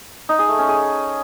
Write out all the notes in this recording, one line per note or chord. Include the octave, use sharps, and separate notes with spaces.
D#4
G#4
A3
C#4
G#4